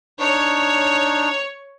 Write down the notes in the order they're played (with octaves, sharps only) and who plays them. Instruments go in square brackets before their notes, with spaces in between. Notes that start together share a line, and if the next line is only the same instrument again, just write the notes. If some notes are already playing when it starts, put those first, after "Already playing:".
[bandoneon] D4 D#4 [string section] C#5